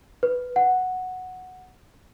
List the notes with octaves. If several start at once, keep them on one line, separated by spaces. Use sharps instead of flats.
B4
F#5